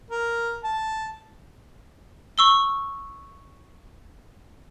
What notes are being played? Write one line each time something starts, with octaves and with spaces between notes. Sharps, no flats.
A#4
A5
C#6 E6 G7